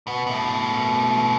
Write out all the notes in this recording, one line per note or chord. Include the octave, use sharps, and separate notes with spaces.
B2 B3
B2 A3